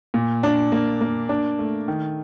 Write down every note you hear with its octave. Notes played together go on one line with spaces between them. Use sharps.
A#2
D4
A#3
A#3
D4
A3
D#3